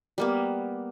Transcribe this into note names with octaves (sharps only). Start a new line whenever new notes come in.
G3 A#3 B3